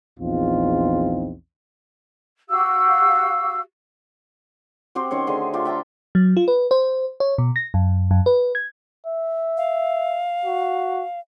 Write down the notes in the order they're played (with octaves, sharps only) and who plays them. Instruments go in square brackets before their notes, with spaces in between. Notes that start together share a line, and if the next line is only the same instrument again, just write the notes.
[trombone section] A#1 E2 C4 D#4 F4
[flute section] F#4 G4 F5 E6
[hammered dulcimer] C4 F#4 G4 C5
D#3 C#4 C5 C#5
D3 A3 G#4 C6
A3 F4 G4
E5 G5 A5 A#5
[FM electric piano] F#3
F4
B4
C5
C#5
B2
A#6
F#2
F#2
B4
G#6
[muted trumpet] E5
[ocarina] F5
[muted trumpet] F#4